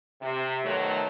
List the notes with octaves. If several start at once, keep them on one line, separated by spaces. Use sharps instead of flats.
C3
B2 D#3 F3 F#3 A3